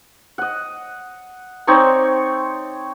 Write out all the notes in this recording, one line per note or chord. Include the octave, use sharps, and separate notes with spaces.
D#5 F#5
C4 D#4 C#5 D5